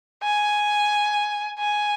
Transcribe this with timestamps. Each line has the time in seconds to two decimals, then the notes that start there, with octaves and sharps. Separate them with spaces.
0.24 G#5
1.59 G#5